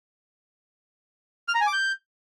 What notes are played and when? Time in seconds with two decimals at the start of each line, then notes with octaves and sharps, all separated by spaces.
1.48 F6
1.54 A#5
1.61 G#5
1.67 D6
1.73 G6